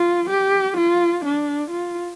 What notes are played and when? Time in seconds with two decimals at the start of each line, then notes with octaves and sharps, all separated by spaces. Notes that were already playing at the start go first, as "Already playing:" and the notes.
Already playing: F4
0.30 G4
0.77 F4
1.25 D4
1.71 F4